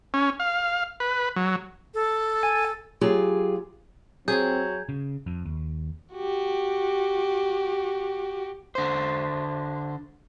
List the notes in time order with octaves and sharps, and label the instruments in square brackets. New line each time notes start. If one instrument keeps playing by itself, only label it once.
[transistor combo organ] C#4
F5
B4
F#3
[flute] A4
[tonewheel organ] G#5
[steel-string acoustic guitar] F#3 F4 G4 G#4 G#5
[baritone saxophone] F#3 [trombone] C4 [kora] G#4 [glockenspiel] G6 G#6
[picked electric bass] C#3
F2
D#2
[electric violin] F#4 G4
[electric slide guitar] D3 C5